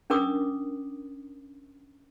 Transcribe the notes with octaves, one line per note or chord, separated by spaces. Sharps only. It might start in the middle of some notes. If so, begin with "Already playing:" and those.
C#4 D4 A#4 D6 D#6